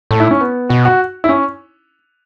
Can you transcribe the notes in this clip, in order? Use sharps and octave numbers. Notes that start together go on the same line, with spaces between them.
A2 A3
E4
C#4
B3
B2 F#4
F#4
E4
C#4